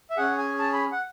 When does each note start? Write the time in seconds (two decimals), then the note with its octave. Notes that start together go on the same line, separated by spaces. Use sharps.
0.10 E5
0.17 C#4 G#4 F#5
0.38 G#5
0.59 A5
0.73 B5
0.92 F#5